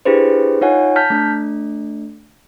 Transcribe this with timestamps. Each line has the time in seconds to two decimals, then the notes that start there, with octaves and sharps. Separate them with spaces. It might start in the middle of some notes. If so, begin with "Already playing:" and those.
0.05 D4 E4 G4 G#4 B4 C5
0.61 D#4 F4 C#5 F#5 G#5
0.96 A5 F6 G6 B6
1.10 A3 D4